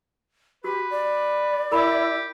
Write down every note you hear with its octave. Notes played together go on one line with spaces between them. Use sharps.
F#4 G4 B4
D5
E4 G4 A#4 B5